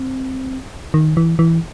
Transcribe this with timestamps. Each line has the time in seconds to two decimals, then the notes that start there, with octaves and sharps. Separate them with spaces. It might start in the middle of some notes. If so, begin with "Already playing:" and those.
Already playing: C4
0.94 D#3
1.17 E3
1.39 E3